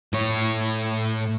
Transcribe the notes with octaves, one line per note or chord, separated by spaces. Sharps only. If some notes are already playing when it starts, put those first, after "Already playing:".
A2 C#5